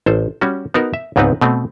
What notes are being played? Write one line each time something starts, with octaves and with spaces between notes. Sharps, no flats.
A1 A4 C5
G3 C#4 F#4
B3 D#4 F#4 A#4
E5
C#2 G#2 B3 C4 D#4 B4
B2 A3 C4